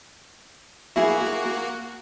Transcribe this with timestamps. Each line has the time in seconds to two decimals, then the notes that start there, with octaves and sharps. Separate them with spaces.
0.96 A#3 E4 F#4 G#4